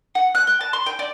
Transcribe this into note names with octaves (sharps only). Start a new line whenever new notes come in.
F#5
F#6
G5
A5
C6
G5
D5